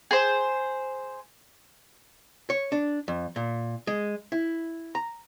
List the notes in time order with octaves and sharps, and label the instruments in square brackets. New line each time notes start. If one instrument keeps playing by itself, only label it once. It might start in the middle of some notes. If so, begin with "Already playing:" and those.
[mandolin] G#4 C5
[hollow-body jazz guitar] C#5
D4
F2
A#2
G#3
E4
A#5